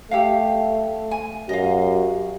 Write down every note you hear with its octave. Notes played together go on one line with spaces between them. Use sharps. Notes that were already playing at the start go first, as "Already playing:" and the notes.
A3 G4 A4 F5
G#5
F#2 F#4 G4 D#5 F5